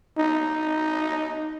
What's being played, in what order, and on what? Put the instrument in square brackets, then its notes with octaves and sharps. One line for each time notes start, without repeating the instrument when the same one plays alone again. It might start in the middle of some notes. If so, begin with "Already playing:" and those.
[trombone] D#4